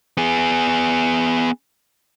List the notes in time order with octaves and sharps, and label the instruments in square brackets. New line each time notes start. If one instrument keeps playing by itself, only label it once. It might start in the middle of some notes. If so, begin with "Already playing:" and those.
[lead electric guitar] B3 G#4